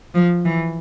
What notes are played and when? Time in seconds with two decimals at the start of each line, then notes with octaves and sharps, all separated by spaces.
0.14 F3
0.45 E3